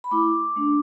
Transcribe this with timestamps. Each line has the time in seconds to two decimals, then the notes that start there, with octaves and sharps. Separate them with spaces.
0.04 B5
0.11 A3 E4 D6
0.56 A3 D4